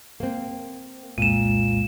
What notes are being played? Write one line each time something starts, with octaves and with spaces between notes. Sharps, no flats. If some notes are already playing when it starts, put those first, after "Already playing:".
A#3 C4
C2 F2 A#2 G#3 D#7 E7